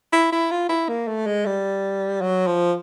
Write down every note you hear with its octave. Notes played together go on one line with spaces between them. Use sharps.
E4
E4
F4
E4
A#3
A3
G#3
G3
F#3
F3